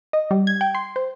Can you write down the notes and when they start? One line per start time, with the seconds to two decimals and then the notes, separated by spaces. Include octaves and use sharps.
0.13 D#5
0.31 G3
0.47 G#6
0.61 G5
0.75 C6
0.96 C5